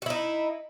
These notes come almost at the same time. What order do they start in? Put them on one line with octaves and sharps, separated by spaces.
F#4 E4 D#4